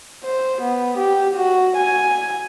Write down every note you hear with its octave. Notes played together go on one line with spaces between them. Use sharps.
C5
B3
G4
F#4
G#5